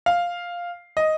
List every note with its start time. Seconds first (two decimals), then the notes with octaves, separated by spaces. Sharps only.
0.06 F5
0.97 D#5